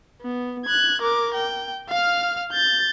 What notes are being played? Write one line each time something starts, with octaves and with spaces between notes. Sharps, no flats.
B3
F#6 G#6
A#4 D6
G5
F5 F6
G6 A6